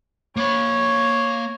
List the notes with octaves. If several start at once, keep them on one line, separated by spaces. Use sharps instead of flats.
A#3 C#5 B5